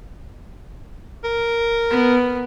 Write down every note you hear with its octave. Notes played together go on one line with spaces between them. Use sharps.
A#4
B3